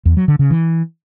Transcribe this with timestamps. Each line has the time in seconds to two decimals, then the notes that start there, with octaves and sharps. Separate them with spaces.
0.05 E2
0.17 F#3
0.28 D3
0.39 C#3
0.51 E3